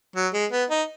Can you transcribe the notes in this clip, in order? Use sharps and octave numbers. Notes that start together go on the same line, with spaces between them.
F#3
G#3
B3
D#4